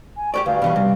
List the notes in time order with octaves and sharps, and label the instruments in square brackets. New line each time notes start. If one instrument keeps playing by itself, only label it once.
[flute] G#5
[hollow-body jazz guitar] G4 B4 D5 [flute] C#6
[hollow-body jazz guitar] D2 [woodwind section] G2 [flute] F5
[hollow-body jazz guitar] B2 E3 G3
[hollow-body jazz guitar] C3 [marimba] G3